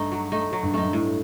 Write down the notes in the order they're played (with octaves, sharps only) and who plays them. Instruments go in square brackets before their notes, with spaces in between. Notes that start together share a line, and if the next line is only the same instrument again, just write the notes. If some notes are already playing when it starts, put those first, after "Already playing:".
Already playing: [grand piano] G2 [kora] A3 D#4
[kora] F#3
A3 D#4
F#3
[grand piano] G2
[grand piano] F#2 [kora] A3 D#4
[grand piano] G2
[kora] A2